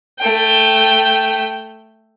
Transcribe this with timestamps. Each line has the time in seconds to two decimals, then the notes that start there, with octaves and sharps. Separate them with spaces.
0.19 A3 G5